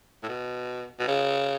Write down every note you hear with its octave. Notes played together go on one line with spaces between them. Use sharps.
A2
B2
B2
C#3